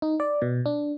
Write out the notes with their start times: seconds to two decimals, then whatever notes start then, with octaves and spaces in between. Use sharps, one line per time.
0.02 D#4
0.20 D5
0.42 B2
0.66 D4